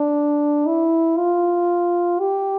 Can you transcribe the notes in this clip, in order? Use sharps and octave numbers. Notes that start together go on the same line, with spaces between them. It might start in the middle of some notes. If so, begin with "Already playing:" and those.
Already playing: D4
E4
F4
G4